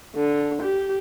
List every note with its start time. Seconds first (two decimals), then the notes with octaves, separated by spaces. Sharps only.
0.15 D3
0.62 G4